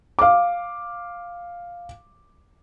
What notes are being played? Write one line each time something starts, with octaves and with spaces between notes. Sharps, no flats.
F5 D6